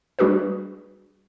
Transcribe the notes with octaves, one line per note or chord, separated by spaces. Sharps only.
G3 D4 F#4 G#4 B4